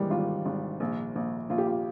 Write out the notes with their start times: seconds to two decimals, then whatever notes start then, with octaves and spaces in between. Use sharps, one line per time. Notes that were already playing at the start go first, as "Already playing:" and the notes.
Already playing: G#1 E3 G3 G#3 A#3
0.10 G#1 F4
0.46 G#1
0.80 A#1
1.15 A#1
1.50 A#1 F4
1.58 G4
1.67 F4